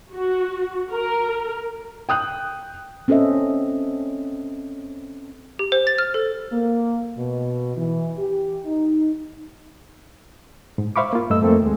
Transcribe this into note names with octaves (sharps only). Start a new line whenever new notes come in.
F#4
A#4
G5 D#6 F#6
C4 C#4 A4 C5 D#5 E5
G4
C5
A6
F6
A4
A#3
B2
E3
G4
D#4
G#2
C5 E5 F5 B5 C#6 D6
A#3 F4
G2 A3 D#5 E6
F2 A3 A#3 C4 A4
D#2 G#3